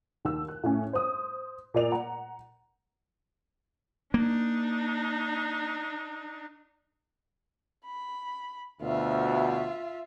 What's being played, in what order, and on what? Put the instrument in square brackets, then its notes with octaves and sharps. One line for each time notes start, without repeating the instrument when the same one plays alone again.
[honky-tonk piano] D#2 E6
F#6
A2 C#4
C5 D#6
A#2 A#3 D5 F7
F#5 A#5
[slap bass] A#3 [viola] D4 D#4
[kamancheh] B5
[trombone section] D2 B2 [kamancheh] F4 E5